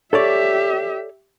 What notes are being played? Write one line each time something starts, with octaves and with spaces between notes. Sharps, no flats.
G4 A4 C#5 D5 E5